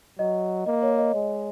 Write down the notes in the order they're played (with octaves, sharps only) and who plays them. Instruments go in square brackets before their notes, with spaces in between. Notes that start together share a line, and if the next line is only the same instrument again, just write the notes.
[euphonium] F#3 [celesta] D#5
[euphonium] A#3 [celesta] D#5
[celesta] C#5
D#5
[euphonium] G#3